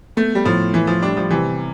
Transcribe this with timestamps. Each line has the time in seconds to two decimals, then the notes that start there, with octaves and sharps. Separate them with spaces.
0.17 A3 B3
0.35 G3
0.45 A2 F3
0.73 E3 E4
0.87 F3
1.02 G3 D4
1.17 F3
1.30 C3 E3